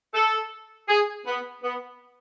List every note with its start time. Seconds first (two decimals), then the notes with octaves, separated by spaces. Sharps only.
0.14 A4
0.89 G#4
1.26 B3
1.64 B3